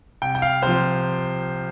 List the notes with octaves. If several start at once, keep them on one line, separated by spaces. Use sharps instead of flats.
C2 G5
G5
F5
C3 F3 C5